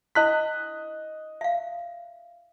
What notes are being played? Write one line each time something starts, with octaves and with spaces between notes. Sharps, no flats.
D4 E4 D#5 C6 F#6 B6
E5 F5